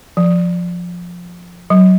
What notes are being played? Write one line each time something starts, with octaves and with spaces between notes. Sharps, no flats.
F3
F#3